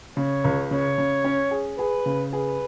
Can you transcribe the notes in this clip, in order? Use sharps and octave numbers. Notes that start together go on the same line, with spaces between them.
C#3 C#5
C#2
C#3 C#5
C#3
C#4
G#4
G#4 B4
C#3
G#4 B4